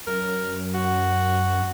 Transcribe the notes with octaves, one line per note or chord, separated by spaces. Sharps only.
F#2 A#4
F#4